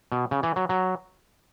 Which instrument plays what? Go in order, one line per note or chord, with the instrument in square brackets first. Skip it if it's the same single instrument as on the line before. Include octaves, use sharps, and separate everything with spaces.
[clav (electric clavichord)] B2
C#3
E3
F#3
F#3